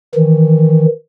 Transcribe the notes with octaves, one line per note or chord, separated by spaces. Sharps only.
D#3 E3